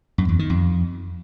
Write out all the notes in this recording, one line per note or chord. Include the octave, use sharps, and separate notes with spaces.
F#2
E2
D#3
F2